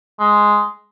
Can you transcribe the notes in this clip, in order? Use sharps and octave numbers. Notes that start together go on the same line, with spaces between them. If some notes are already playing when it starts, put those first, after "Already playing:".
G#3